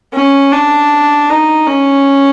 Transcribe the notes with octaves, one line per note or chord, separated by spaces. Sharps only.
C#4
D4
D#4
C#4